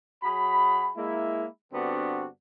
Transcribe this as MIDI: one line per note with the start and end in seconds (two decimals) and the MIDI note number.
0.23 0.91 54
0.23 0.91 66
0.23 0.91 68
0.23 0.91 83
0.97 1.47 56
0.97 1.47 58
0.97 1.47 64
1.73 2.28 43
1.73 2.28 50
1.73 2.28 59
1.73 2.28 60
1.73 2.28 62
1.73 2.28 66